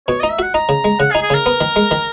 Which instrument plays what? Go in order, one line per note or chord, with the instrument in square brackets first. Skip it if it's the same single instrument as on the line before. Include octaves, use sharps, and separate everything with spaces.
[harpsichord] B2 [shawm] C#5
[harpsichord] D#4 [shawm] D#5
[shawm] E5
[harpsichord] F#4 [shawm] F#5
[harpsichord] D#4 [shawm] A#5
[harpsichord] C#3
G#3
[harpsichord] C#3 [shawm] F#5
[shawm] G#4
[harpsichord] D#4
[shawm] G#4
[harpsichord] C#3 [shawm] A#4
[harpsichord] B3
D#3
G#3
D#3